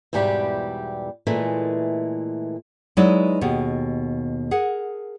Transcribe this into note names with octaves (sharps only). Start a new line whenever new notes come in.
E2 G#2 B2 G3 E4 G4
A#2 E3 G#3 A3
F#3 G#3 D#4 E4 B4 D5
D#2 B2 G4 G#4
G#4 A#4 F#5